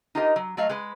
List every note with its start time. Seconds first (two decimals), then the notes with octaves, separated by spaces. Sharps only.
0.15 D#4 F4 G4 A#4 D#5
0.36 F#3
0.57 F#3 A3 D#5 F5
0.69 G#3 B4